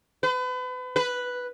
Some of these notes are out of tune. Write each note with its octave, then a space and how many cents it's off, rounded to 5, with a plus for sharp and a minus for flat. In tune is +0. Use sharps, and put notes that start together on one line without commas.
B4 +35
B4 +0